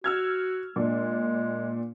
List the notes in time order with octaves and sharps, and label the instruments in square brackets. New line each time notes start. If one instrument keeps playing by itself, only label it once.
[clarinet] F#4 [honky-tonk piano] E6 F6 G#6
[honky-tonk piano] A#2 D4 [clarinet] G#3